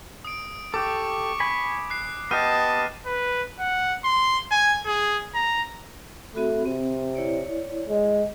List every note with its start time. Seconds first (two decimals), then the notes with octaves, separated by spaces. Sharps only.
0.25 D#6 D7
0.74 G4 A4 C#6 D6
1.40 G#5 B5
1.90 F#6 C7
2.31 B3 G4 D#5 A5 F6 D#7
3.06 B4
3.60 F#5
4.04 C6
4.51 G#5
4.86 G#4
5.35 A#5
6.35 A3 C4 F#4 B5
6.65 C3 C4
7.15 E4 C#5 D5
7.89 G#3